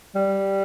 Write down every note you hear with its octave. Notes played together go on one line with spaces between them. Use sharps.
G3